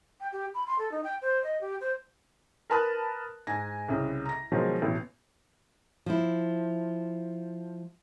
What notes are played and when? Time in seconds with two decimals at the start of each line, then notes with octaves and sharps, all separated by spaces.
0.20 G5
0.32 G4
0.54 B5
0.67 C6
0.78 A4
0.91 D#4
1.04 G5
1.22 C5
1.44 D#5
1.61 G4
1.81 C5
2.70 A#4 B4 A5 B5 D#6 F#6
3.47 G#2 G#5 A#6
3.88 C2 C#3
4.25 A#5 A#6
4.52 B2 D#3 F3 F#3 G#3
4.82 A1 B2
6.06 F3 E4